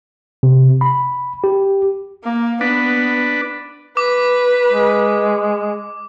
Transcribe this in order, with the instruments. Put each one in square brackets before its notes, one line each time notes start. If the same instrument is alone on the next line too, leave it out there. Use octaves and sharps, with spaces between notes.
[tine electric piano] C3
B5
G4
[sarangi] A#3
[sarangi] B3 [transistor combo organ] D4 B4
[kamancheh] B4 [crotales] D6
[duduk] G#3